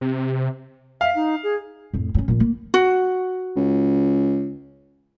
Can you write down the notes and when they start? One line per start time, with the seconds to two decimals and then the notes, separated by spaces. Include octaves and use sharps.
0.01 C3
1.01 E5 F5
1.15 D#4
1.43 G#4
1.94 F2 A2
2.14 G2 C#4
2.28 A#2 F3
2.40 A#3
2.74 F#4
3.56 C#2